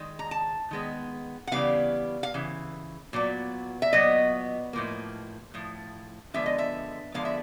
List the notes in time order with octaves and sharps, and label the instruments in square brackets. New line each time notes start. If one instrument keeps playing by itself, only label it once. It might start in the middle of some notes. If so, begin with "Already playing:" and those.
Already playing: [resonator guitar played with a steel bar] D#3 G#3
A#5
A5
D#3 G#3 B3
F#5
C#3 E3 G3 B3 F5
F5
C#3 E3
A#2 F#3 B3
E5
A#2 F#3 B3 D#5
A2 F3 A#3
A2 F3
D3 F3 G#3 B3 E5
D#5
E5
D3 F3 G#3 B3 F5
E5